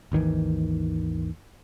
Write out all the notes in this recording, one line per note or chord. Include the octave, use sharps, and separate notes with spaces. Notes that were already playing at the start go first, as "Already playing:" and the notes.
G#1 D#2 D#3 E3